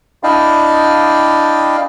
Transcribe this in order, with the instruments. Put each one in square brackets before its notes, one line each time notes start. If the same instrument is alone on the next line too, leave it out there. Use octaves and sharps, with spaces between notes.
[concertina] D4 E4 D5 D#5 F5 G5